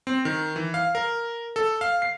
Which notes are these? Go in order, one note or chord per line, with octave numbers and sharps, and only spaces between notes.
C4
D#3
E3
F5
A#4
A4
F5
C7